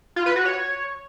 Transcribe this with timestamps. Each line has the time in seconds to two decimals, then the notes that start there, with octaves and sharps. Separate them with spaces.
0.16 F4
0.26 B4
0.36 F#4
0.45 C#5